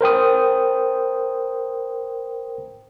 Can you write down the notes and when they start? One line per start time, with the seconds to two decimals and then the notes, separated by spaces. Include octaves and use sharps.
0.01 A#4 C5 G5 D#6